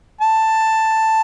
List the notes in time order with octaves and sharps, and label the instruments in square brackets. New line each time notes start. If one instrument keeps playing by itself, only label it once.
[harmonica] A5